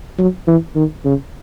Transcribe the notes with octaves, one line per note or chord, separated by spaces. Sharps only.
F#3
E3
D#3
C#3